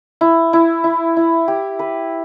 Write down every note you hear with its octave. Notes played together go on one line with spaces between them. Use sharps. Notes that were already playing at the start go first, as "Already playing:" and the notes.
E4
E4
E4
E4
G4
B4